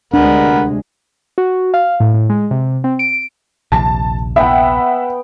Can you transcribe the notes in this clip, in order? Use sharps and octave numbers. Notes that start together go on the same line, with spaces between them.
D2 C3 G#3 D4 A#4 F#5 B5
F#4
F5
A2
A2
G#3
C3
C4
D7
A#1 D#2 C3 A5
B3 E5 F#5 G5